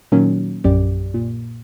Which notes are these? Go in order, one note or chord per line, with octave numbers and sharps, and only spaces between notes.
A#2 D#3 F#3 A#3 C#4
A#1 F#2 G4 D5
A#2